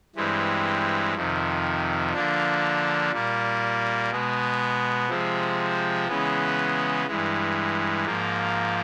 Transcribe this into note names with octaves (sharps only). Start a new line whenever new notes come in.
G2 E3 G#3 C4
F2 C3 D#3
D3 F3 A#3 D4
A#2 G3 A#3
B2 G#3 B3
C3 F3 G#3 C4
C#3 E3 G#3 B3
G2 E3 G#3
G#2 F3 A#3